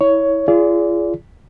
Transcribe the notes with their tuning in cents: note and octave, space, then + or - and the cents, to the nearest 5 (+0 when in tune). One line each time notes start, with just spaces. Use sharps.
E4 -20 C#5 +10
F4 -40 G#4 +0 D5 -30